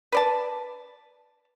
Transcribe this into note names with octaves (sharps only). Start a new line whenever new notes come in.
B4 D5 A5